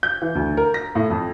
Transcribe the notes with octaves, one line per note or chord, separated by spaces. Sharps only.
G6
E3
D2
A#4
A#6
A2
F2